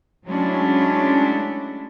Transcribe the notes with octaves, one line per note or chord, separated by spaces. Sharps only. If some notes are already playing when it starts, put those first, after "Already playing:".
F#3 G#3 A3 C#4 D4 E4